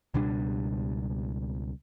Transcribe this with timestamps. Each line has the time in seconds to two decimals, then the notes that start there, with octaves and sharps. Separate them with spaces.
0.14 C#2 B2 G3 D4